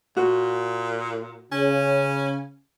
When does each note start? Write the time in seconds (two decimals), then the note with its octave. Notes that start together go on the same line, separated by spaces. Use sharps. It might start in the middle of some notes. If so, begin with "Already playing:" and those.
0.17 A#2 F#4
1.52 C#3 C#4